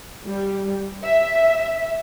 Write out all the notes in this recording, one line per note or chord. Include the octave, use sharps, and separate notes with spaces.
G3
E5